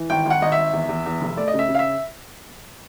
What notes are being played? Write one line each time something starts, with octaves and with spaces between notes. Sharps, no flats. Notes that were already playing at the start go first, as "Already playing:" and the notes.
Already playing: E3
G#1 G5
G#1 F#5
G#1 D#5
G#1 E5
E2
E2
E2
F1
A3 D5
D#5
C#3
E5
C#3
F5
E5